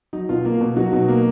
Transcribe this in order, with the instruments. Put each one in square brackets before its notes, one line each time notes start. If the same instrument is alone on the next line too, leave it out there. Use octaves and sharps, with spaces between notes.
[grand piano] F#3 D#4
B2 F4
A#3
B2
F#3 D#4 F#4
B2
A#3